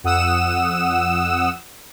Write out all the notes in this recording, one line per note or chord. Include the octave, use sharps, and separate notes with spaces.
F2 F#5 D#6 E6 E7